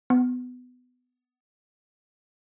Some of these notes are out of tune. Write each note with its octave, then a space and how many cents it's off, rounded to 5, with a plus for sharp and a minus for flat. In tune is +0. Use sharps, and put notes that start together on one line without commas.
B3 +20